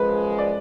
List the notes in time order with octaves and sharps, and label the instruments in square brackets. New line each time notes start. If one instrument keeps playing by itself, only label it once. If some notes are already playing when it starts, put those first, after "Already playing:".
Already playing: [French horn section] F#2 F3 G#3 [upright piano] B4
[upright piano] D5